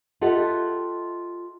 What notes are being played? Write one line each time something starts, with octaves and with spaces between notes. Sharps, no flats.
F4 G4 A4 D#5 E5 F#5